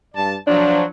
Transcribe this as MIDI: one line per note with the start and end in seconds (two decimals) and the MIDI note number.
0.14 0.36 43
0.14 0.36 74
0.14 0.36 81
0.47 0.82 53
0.47 0.82 54
0.47 0.85 62